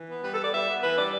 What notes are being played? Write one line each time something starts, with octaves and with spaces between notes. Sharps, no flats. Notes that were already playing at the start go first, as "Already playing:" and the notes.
Already playing: E3
B3
G3 B4
A4
B3 D5
G3 E5
B3
E3 B4
G3 D5